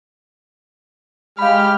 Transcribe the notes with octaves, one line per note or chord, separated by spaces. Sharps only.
G#3 G4 F5 B5 F6